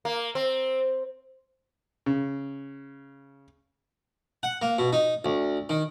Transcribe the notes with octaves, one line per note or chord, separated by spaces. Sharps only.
A#3
C4
C#3
F#5
A#3
B2
D#4
D2
D#3